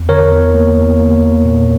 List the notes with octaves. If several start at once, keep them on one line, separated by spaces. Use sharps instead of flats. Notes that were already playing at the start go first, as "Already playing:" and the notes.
Already playing: E2
D3 A#4 C#5
E2
A#3
E2
A#3
A#3
A#2